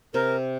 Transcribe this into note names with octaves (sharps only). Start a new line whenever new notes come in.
C3 A#4